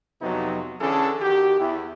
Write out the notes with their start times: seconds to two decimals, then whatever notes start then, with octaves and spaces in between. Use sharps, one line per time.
0.22 F2 C3 F#3 B3 D#4
0.80 D3 E3 C#4 G#4 A4
1.22 D#3 F#4 G4
1.59 E2 E4